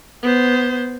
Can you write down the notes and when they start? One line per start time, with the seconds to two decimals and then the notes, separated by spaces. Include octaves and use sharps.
0.22 B3 C5